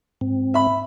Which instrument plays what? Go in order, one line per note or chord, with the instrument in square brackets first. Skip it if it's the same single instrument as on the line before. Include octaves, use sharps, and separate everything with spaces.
[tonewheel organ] G#2 C4
[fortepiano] E5 B5